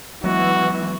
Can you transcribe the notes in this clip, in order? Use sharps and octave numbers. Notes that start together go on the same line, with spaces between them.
E3 F#3 G#3 B3 F#4